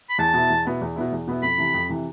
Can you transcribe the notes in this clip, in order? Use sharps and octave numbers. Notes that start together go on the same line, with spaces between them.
B5
E2 A5
B2 B3 E4
E2
B2 B3 E4
E2
B2 B3 E4
E2
B2 B3 E4
F2 B5
C3 E3
F2
C3 E3